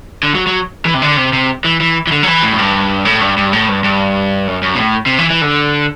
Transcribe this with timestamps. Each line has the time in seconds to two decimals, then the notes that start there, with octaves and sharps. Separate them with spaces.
0.23 D3
0.35 F#3
0.47 F#3
0.85 E3
0.94 C3
1.02 D3
1.17 C3
1.33 C3
1.65 E3
1.80 E3
2.07 E3
2.12 D3
2.23 F#3
2.27 E3
2.43 A2
2.52 F#2
2.59 G2
3.05 A2
3.21 G2
3.37 G2
3.53 A2
3.69 G2
3.84 G2
4.47 F#2
4.62 F#2
4.75 B2
4.79 A2
5.06 C3
5.19 E3
5.30 E3
5.42 D3